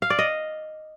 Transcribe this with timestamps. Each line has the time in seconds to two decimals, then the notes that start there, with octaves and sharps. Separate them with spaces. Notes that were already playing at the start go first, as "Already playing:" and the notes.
0.02 F5
0.10 D5
0.19 D#5